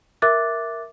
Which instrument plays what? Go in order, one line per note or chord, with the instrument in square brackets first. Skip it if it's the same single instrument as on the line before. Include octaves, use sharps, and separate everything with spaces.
[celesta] A#4 E5 D6 F#6 A6